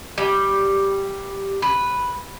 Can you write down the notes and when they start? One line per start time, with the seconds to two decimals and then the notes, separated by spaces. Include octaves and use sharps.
0.18 G3
1.62 B4